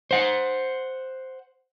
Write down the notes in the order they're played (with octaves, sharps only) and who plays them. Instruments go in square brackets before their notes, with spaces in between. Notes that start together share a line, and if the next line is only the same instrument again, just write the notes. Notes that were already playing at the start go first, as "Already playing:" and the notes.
[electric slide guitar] C5 F#5